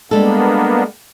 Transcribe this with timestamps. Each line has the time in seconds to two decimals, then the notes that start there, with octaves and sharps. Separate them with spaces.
0.11 G3 G#3 A#3 B3 D4 A4